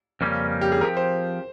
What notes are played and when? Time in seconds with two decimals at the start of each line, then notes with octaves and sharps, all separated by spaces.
0.21 F2 C#3 G3 A#3 C#4
0.61 G4
0.72 G#4
0.81 F3 C4 G4 A#4
0.97 C5